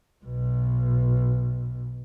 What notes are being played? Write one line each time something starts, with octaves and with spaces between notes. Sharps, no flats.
B1 B2